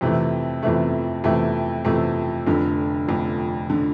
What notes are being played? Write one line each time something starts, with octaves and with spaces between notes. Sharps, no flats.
F2 C3 E3 A3
F2 C3 E3 A3
F2 C3 E3 A3
F2 C3 E3 A3
F1 F2 D3
F1 F2 D3
D3